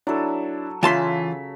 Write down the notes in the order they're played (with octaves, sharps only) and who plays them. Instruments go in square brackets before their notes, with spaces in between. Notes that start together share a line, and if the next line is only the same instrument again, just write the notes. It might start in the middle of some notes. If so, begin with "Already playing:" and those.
[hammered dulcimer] F#3 A4 [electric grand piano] D4 E4
[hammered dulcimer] C#3 [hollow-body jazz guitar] E3 A5 C6 [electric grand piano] F4 B6